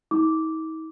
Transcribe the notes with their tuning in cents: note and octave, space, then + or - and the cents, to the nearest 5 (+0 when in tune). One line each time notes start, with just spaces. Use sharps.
D#4 +45 D6 -10